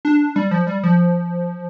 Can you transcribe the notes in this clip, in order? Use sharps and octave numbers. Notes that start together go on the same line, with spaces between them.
D4
G3
F3
G3
F3